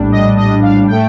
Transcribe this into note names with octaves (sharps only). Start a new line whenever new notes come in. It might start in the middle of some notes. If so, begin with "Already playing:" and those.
Already playing: A#1 A2 G3 D4
D#5
D#5
F5
A2 A3 G5